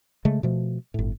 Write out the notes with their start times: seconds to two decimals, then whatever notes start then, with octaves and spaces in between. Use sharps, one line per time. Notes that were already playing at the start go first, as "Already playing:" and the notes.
0.25 C#3 G#3 A3
0.43 B2 F3 A3
0.94 G1 A2